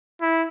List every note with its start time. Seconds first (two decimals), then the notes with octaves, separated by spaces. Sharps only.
0.22 E4